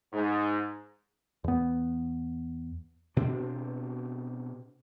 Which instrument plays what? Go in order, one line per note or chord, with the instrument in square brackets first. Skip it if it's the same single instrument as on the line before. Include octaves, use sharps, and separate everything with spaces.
[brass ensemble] G#2
[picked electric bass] E2 B3
[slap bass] B2 C4 D4